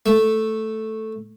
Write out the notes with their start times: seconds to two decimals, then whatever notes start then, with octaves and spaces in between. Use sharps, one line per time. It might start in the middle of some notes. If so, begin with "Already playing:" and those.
0.06 A3